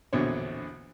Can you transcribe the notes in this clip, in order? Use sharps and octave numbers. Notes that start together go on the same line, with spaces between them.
A#1 E2 B2 D3 C4 C#5